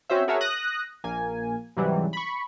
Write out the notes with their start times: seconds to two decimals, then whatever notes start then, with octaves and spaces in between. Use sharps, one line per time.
0.10 C4 C#4 F#4 C5 E5
0.28 F#4 G#4 A#4 C#5 E5 A5
0.41 D#6 F#6 A#6
1.04 A#1 A#3 G#5
1.77 G#2 C3 E3 F#3 G3
2.13 B5 C#6